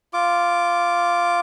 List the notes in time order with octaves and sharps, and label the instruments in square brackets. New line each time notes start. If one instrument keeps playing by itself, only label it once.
[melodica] F4 D6